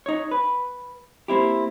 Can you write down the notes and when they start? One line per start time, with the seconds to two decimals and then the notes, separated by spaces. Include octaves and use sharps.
0.06 D#4 C#5
0.31 B4
1.28 A#3 C4 E4 G4